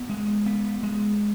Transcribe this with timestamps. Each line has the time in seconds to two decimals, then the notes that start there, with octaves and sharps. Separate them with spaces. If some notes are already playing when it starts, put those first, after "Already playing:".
Already playing: B3
0.10 G#3
0.46 B3
0.83 G#3